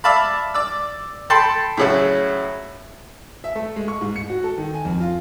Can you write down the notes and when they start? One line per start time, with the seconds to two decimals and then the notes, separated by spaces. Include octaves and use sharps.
0.04 D5 E5 F5 A5 B5
0.54 D5 E6
1.30 A4 G5 A5 B5 C6
1.77 A2 C#3 F#3
3.44 E5
3.56 A3
3.76 G#3
3.88 C#6
4.01 G#2
4.16 C#7
4.30 F#4
4.44 A4
4.58 D#3
4.74 G#5
4.85 F2
5.00 F4